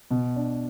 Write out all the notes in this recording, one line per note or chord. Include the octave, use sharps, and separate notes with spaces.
B2
D4